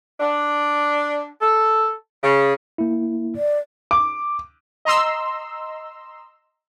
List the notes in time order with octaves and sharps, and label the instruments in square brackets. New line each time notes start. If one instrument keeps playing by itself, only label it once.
[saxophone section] D4
A4
C#3
[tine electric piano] A#3 E4
[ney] D5
[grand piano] D6
[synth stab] D#5 A#5 C6 E6